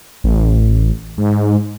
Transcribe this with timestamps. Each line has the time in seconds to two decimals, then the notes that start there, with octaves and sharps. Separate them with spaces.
0.24 A1
1.18 G#2